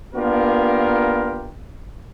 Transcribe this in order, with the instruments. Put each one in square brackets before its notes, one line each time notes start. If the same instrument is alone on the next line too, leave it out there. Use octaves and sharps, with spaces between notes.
[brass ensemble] A#3 B3 D4 F4 G4 A#4